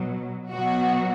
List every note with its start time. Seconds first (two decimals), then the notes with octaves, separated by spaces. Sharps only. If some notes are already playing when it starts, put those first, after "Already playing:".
Already playing: B2 F#3
0.51 B2 F#3 F#4